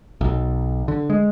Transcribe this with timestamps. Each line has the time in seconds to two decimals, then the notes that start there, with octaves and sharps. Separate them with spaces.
0.21 B1
0.88 D3
1.10 G#3